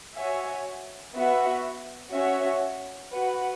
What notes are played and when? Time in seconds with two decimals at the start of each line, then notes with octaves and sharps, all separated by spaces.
0.15 F#4 C#5 E5 G#5
1.13 B3 F#4 E5
2.12 C#4 F#4 C#5 E5
3.11 F#4 B4 F#5